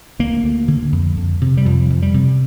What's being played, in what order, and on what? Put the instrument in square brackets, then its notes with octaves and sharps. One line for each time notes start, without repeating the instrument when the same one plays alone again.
[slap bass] D2 A#3
D2
D3
F2
F2
C3
G3
F2 F3
F2
G3
C3